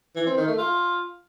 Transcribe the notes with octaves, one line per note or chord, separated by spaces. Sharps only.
E3
C4
D#3
A3
F4